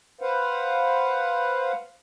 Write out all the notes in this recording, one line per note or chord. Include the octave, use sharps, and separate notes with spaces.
B4 C5 F5 F#5